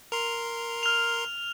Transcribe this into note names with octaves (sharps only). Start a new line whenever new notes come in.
A#4 C6 F7
F6 F7